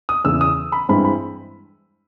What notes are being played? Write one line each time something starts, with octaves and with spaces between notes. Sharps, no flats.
D#6
E2 C#3 E3 E6
D#6
B5
G2 E3 G#3 C4 B5
B5